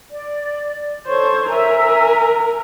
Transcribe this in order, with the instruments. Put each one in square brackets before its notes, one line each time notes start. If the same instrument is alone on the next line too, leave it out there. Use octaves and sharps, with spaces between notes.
[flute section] D5
[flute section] A4 C#5 C#6 [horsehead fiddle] C5
[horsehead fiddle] A#4 [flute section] E5 G#5 E6